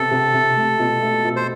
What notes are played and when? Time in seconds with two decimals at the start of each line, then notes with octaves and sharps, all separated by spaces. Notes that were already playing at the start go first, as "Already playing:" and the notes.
Already playing: C3 B3 A4
0.11 C3
0.34 C3
0.57 A3
0.79 B2
1.02 A3
1.25 B2
1.36 C5